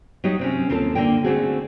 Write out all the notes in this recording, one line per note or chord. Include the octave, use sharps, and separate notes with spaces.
F#3 D#4 G4 D#5
C3 C4 C#4
D#2 C4 F4 A4 A5
D3 A#3 G5
D3 A3 A#3 C4 F#4 G#4